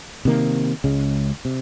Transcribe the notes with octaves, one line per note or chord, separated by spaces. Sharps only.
C3 D#3 A#3
C#2 C#3 G#3
C3